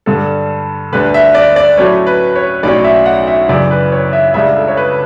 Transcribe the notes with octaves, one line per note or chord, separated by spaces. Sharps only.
G2 D3 G3 A4
D2 D3 G3 D4 B4
E5
D5
D5
A2 F#3 A3 C#4 C#5
B4
C#5
B1 A2 F#3 C#4 D5
E5
F#5
E5
F#2 C#3 E3 D5
B4
C#5
E5
C#2 C#3 G3 D4 E5
A4
C#5
B4